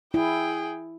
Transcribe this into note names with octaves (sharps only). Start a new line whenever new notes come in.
E4 G#4 G5